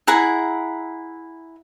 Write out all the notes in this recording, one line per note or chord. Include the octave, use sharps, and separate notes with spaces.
E4 G#4 F#5 A#5